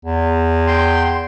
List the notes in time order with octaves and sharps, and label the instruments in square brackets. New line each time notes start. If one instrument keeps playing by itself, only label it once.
[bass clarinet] E2
[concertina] G5 C6